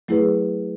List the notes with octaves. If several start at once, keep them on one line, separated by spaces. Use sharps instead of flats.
F#3 A3 E4 G#4 B4